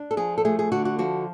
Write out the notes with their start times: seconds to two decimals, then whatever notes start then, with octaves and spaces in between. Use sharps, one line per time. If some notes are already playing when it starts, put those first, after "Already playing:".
Already playing: D4
0.11 A4
0.17 F3 G#4
0.38 A4
0.45 A3 G#4
0.59 G#4
0.72 D3 F#4
0.85 F#4
0.99 F3 F#4